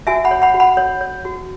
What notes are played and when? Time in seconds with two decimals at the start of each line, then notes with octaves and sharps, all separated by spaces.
0.07 F#4 E5 G#5
0.25 F#5 B5
0.31 C#5
0.42 F#5 B5
0.54 F#4
0.60 F#5 B5
0.77 C#5
1.01 C#5
1.25 F#4